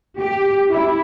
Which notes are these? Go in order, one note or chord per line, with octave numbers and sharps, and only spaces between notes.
G4
E4